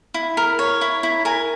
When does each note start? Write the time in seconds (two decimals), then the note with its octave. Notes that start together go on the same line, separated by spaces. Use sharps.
0.14 E4
0.37 A#4
0.59 C#5
0.81 E4
1.03 E4
1.25 A#4 G#5